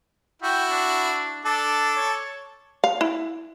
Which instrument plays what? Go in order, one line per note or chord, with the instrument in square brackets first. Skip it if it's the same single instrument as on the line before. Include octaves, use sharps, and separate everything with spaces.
[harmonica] E4 F#4 [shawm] G5
[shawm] D4
[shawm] D4 [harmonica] A4 D6
[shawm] C#5
[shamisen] F5
E4